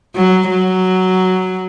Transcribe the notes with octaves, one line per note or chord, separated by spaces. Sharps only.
F#3
F#3